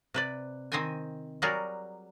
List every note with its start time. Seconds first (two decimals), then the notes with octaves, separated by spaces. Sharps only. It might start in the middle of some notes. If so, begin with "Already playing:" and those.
0.14 C3 B4 D5
0.72 D#3 C4 C5 D#5 G5 G#5
1.42 F#3 G3 F#4 G#4 A#4 D5